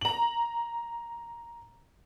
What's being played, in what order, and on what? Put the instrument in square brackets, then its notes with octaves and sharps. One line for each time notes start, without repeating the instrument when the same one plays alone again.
[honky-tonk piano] A#5 F#7